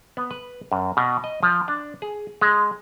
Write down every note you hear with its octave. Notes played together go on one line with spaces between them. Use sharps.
B3
B4
F#2
B2
D#5
F3
D4
G#4
G#3